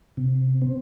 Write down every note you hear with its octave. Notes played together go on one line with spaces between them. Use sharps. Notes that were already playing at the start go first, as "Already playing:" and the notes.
C3
C4